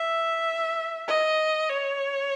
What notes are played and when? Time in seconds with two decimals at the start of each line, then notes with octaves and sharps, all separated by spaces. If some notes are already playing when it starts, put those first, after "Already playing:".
Already playing: E5
1.07 D#5
1.69 C#5